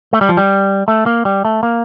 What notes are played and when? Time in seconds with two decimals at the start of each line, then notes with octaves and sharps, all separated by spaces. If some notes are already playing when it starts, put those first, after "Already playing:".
0.13 A3
0.21 G3
0.29 F3
0.37 G3
0.88 A3
1.06 A#3
1.25 G3
1.45 A3
1.63 A#3